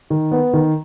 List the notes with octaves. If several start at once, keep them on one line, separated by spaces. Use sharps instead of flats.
D#3
B3
D#3